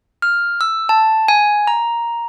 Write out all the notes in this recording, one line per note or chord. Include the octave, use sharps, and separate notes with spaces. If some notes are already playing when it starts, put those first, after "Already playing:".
F6
E6
A5
G#5
A#5